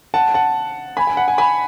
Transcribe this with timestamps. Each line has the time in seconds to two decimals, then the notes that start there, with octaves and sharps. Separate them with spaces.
0.14 F#5 A5
0.34 F#5 A5
0.97 G#5 B5
1.07 G#5
1.17 F#5
1.28 G#5
1.38 G#5 B5